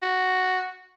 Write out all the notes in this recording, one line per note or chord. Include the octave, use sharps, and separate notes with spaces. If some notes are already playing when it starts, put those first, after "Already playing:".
F#4